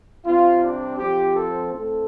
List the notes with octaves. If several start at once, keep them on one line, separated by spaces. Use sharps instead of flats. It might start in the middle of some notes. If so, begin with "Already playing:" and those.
C3 G3 C4 F4
D4
F2 F3 C4 G4
A4
A2 A3 C4 A4